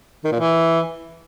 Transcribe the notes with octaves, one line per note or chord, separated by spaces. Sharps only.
D#3
A#2
E3